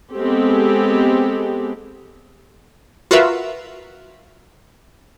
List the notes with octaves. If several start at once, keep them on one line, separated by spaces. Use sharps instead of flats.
G#3 B3 C4 G4 A4
F4 F#4 A#4 B4 E5